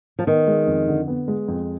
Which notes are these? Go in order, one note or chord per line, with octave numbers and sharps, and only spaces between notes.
F3
D#3 B3
G#3
F2
D3
B3
G#3
F2